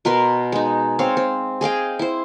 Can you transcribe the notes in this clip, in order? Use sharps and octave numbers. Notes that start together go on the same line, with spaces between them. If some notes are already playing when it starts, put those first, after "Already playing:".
B2 A#4 B4 C6
G#3 D#4
C4 C#5 F5
C4
G#4 D#5 F5 G5
E4 C5